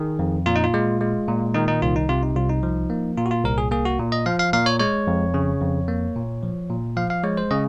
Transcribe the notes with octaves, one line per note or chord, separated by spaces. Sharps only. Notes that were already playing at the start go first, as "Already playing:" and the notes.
Already playing: D#3 G#4
F2
A#2 F4
D#4
F4
G#3
G#3
A#2
D#3 D#4
D#4
C2 F4
D#4
C3 F4
D#4
C2 F4
D#4
F3
A#3
A#2 F4
F#4
F4
C2 A#4
G#4
A#3 G#4
F#4
A#2
D#5
F3 F5
F5
A#2 F5
C#5
G#3 C#5
F2
C#3
F2
A#3
A#2
F3
A#2
F3 F5
F5
G#3 C#5
C5
C#3 D#5